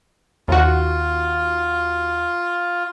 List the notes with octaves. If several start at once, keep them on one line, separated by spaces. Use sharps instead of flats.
D#2 F4 F#4